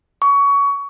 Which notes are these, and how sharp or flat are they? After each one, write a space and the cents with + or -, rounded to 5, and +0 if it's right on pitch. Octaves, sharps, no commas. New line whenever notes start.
C#6 +25